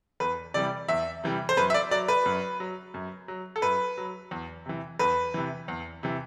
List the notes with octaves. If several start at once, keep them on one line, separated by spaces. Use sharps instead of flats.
E2 B4
C3 E3 G3 D5
E2 E5
C3 E3 G3
C5
F#2 B4
E5
D5
F#3 D5
B4
F#2
F#3
F#2
F#3
A4
F#2 B4
F#3
E2
C3 E3
E2 B4
C3 E3
E2
C3 E3